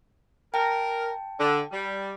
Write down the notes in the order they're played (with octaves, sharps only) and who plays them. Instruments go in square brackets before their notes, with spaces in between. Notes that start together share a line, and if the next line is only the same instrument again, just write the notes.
[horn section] A#4 [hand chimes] G5 A5
[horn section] D3
G3